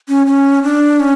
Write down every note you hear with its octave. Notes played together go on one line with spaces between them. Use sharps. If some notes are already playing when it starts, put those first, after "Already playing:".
C#4
C#4
D4
C#4